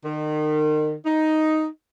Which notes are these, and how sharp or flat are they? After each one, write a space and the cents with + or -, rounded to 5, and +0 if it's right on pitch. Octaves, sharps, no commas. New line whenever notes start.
D#3 -35
D#4 +5